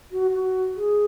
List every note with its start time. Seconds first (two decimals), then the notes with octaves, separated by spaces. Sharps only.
0.12 F#4
0.33 F#4
0.76 G#4